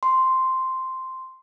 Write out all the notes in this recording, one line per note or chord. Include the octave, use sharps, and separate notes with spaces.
C6